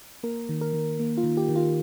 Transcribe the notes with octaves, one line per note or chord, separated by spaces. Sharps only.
A#3 A#4
D#3
A#4
D#3
A#3
F4
D#3
G4
D#3
F4